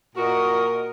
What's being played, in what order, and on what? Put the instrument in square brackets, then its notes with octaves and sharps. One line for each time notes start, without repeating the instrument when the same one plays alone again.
[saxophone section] A#2 F#4 [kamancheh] A#4 D#5